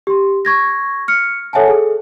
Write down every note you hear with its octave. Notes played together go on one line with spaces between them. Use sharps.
G4 C6
C#6 G#6 A#6
F6 C#7
A4 C#5 E5 F#5 G#5 A5
G#4 A4